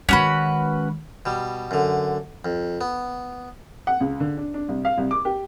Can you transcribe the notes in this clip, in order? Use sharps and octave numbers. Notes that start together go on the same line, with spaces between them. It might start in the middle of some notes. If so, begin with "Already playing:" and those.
D#3 G#3 C#4 F#4 B4
B2 G3
F#2 D3
F2
B3
F#5
C#2
D3
D4
D4
C2
F5
C2
D6
G4